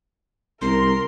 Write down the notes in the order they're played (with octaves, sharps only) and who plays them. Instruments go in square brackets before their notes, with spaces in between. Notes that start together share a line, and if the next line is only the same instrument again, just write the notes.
[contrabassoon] C2 [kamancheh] A#4 A#5 [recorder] C6